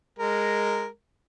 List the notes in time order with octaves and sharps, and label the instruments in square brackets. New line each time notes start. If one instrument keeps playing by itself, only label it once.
[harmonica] G#3 A#4